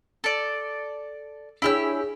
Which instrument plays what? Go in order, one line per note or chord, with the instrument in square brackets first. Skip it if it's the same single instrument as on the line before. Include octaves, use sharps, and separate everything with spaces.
[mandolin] A4 D5
[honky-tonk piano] D4 G#4 C#5 [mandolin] E4 G4 E6